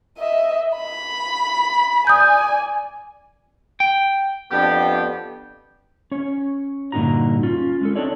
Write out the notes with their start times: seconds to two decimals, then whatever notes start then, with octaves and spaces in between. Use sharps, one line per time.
0.18 D#5 E5
0.77 B5
2.07 D5 G#5 D#6 G6
3.80 G5
4.51 F2 B3 D4 G4
6.11 C#4 C#5
6.92 G2 A#2 D3 D#4 F#4 A#5
7.43 C#4 F4
7.81 G#3 C#4 A4
7.96 C4 D4 D#4 A4 C#5 D5